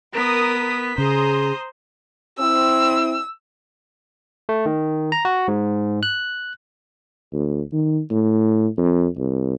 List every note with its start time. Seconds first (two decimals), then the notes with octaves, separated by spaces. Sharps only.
0.13 B3 A#4 D#6 B6
0.98 C#3 G#4 C5 A#5 C6 D#6
2.39 C4 E4 E6
4.49 A3
4.66 D#3
5.12 A#5
5.25 F#4
5.48 G#2
6.03 F#6
7.33 D2
7.73 D#3
8.11 A2
8.78 F2
9.17 C2